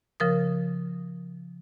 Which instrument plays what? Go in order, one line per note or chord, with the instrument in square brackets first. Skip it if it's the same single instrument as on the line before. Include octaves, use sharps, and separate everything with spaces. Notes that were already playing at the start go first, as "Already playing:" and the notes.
[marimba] C#3 F3 A#4 D#6